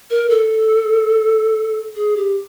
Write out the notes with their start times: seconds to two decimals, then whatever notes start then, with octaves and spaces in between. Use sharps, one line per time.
0.10 A#4
0.30 A4
1.96 G#4
2.17 G4